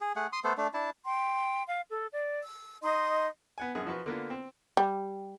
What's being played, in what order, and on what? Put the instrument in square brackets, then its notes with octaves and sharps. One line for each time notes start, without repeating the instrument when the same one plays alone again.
[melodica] G#4
A3 G#4 F#5
C6 D#6
A3 B3 A4 C5
A3 D4
D4 E4 A5
[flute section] G5 C6
F5
A4
D5
E6
D#4 D#5 C6 D#6
[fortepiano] B3 F#5 G#5
A#1 F#2 G#4 F#5
F3 F#4 B4
D3 A#3 B3 F4
C4
[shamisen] G3